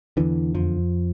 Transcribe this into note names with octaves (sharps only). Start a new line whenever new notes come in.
E2 D3 E3
F2 F3